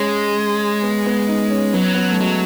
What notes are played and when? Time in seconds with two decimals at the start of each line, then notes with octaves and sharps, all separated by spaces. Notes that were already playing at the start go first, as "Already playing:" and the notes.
Already playing: G#3 C#4
0.83 B3
1.06 B3
1.28 D#4
1.51 C#4
1.73 F#3 B3
1.83 C#4
1.95 B3
2.11 A3
2.20 F#3 G#3